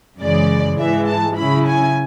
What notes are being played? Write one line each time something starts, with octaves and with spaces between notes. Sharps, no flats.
F#2 C#3 E3 G#3 D5
G#2 E3 G#3 E5
A5
C#3 F#3 C#4 E4 B5
G#5